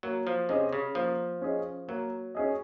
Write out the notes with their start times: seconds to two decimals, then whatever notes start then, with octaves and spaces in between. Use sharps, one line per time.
0.03 F#3 A#3
0.27 F3
0.49 C3 C#4 G#4 D#5
0.73 C#3
0.95 F3 A#3
1.42 C#4 G#4 D#5
1.88 F#3 A#3
2.35 C#4 G#4 D#5